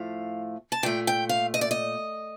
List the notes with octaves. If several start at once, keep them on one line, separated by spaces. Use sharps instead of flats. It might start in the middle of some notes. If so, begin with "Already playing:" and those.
Already playing: A2 F3 A3 F5
A5
A#2 A3 G5
G5
F5
D#5
D5
D#5